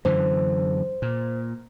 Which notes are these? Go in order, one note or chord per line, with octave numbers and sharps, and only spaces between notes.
F#2 D3 E3 C5
A#2